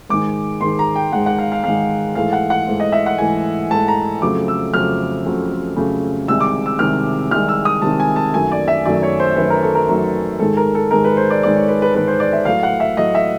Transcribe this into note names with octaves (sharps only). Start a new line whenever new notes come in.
G#2 D#3 G#3 D6
G#2 D#3 G#3 C6
A#5
G5
G#2 D#3 G#3 F#5
F#5
F5
F5
G#2 D#3 G#3 F5
G#2 E3 A3 F5
F#5
F#5
G#2 E3 A3
D#5
E5
F#5
G#2 E3 A3 G#5
G#2 E3 A3 A5
A#5
F2 C#3 F#3 A3 D6
E6
F2 C#3 F#3 A3 F6
F2 C#3 F#3 A3
F2 C#3 F#3 A3
C2 C3 D#3 G#3 E6
D6
E6
C2 C3 D#3 G#3 F6
C2 C3 D#3 G#3 F6
E6
D#6
C2 C3 D#3 G#3 A5
G#5
A5
F#2 D#3 F#3 A3 G#5
D5
E5
F#2 D#3 F#3 A3 D5
C#5
C5
F#2 D#3 F#3 A3 B4
A#4
A4
A#4
F#2 D#3 F#3 A3 A#4
G#2 D#3 G#3 A4
A#4
A4
G#2 D#3 G#3 A#4
B4
C5
D5
G#2 D#3 G#3 D5
C#5
B4
B4
G#2 D#3 G#3 B4
C5
D5
E5
A2 F#3 A3 F5
F#5
E5
A2 F#3 A3 D#5
E5